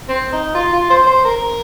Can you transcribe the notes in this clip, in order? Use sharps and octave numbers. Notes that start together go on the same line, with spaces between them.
C4
D#4
F4
F4
C5
C5
A#4